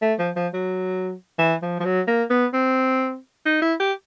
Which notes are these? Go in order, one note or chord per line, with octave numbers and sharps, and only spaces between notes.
A3
F3
F3
F#3
E3
F3
F3
F#3
A#3
B3
C4
D#4
E4
G4